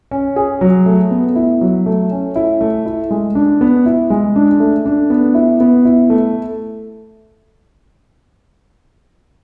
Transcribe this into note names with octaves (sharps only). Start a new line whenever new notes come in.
C#4
G#4
F#3
A3
B3
E4
F#3
A3
C#4
E4
A3
E4
G#3
D4
B3
E4
G#3
D4
A3
D4
B3
E4
B3
E4
A3